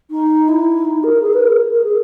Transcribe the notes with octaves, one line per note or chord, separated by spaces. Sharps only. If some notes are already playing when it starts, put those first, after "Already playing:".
D#4
E4
D#4
A#4
G#4
B4
A#4
A#4
G#4